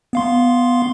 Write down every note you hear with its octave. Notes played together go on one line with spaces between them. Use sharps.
B3 F5 C6